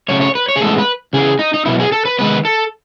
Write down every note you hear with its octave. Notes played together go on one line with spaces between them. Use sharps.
C#3 F#3 A3 C#5
C#5
B4
C#5
G#4
A2 E3 G#3 B3 A4
B4
C#3 E3 B3 G#4
D#4
D#4
B2 F#3 B3 E4
G#4
A4
B4
D#3 G#3 B3 B4
A4